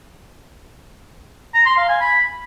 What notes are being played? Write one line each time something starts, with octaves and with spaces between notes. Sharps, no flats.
A#5
C6
F5
G#5
B5